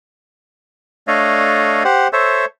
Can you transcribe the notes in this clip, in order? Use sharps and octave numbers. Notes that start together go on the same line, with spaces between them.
A3 D4 A4 C#5 D#5 F5
G4 C5 F#5
A4 C5 C#5 E5